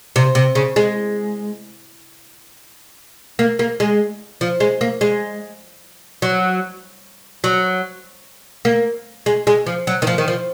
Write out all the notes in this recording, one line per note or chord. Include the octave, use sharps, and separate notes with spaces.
C3
C3
C#3
G#3
A#3
A#3
G#3
F3
G#3
A#3
G#3
F#3
F#3
A#3
G#3
G#3
F3
F#3
D#3
F3
D#3
F3